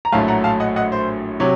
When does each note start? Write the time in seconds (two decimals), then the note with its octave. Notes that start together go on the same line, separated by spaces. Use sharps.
0.05 A#5
0.12 A#1 A2 F#3 A3 F5 A5
0.28 F#5 A#5
0.44 F5 A5
0.60 D#5 F#5
0.76 D#5 F#5
0.92 C5
1.40 C3 F#3 C#5